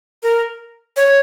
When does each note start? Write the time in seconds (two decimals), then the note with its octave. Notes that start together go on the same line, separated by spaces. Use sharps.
0.23 A#4
0.97 C#5